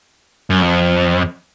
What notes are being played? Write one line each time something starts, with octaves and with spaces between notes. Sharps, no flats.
F#2
F2